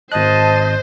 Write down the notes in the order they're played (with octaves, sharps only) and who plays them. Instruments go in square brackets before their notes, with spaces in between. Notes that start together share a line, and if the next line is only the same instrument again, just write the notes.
[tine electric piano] G#1 F#6 [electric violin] C5 [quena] D#5 [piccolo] A5